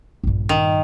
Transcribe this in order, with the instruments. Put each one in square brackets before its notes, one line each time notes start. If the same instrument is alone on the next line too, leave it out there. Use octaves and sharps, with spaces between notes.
[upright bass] A#1 G2
[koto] D#3